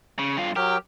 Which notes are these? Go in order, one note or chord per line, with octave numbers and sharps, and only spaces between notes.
C#3
G2 F4
F#3 G4 A#4